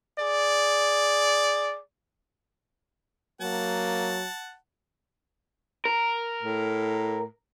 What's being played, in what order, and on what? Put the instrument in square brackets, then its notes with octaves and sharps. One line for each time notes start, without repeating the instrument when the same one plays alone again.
[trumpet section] G#4 D5
[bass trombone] F#3 [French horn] A#3 [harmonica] F#5 A5
[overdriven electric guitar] A#4
[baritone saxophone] A2